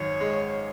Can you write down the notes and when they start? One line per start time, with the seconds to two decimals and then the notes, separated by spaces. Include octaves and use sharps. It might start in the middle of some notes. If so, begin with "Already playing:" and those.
Already playing: G#1 F#2 C#5
0.21 G#3